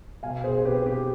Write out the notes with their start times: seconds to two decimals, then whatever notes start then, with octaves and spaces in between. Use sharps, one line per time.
0.23 B2 F5 G#5
0.44 G#4 C5
0.58 C5
0.65 C4 G4 B4
0.86 G4